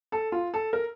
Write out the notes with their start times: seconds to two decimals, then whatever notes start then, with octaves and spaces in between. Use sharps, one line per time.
0.12 A4
0.32 F4
0.54 A4
0.73 A#4